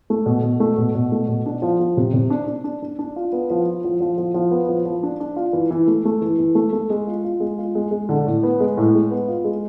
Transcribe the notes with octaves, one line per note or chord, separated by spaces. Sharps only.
A3
B2
B2
A3
B2
B2
A3
B2
D4
F3
F3
C3
C3
D4
D4
D4
D4
D4
F4
B3
F3
F4
F3
F3
F3
F3
B3
F3
F3
D4
D4
F4
E3
E3
A3
A3
E3
E3
A3
A3
G#3
F4
F4
G#3
F4
G#3
G#3
D3
A2
B3
G#3
A2
G#3
B3
F4
G#3